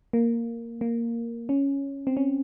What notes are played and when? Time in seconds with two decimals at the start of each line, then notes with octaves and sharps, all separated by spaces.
0.13 A#3
0.81 A#3
1.49 C#4
2.07 C4
2.17 C#4